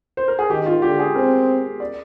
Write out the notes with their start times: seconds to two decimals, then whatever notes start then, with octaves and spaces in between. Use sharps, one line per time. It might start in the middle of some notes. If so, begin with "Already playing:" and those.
0.17 C5
0.28 A#4
0.39 G#4
0.50 D#3 G4
0.66 F4
0.82 D3 G4
0.99 G#4
1.15 C4 A#4
1.80 D5